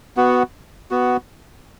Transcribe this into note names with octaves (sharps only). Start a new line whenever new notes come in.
B3 F#4
B3 F#4